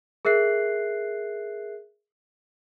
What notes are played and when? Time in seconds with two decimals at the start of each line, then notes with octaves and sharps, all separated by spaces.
0.25 G#4 A#4 E5 F#6 C7